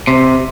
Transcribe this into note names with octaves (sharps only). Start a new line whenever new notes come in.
C3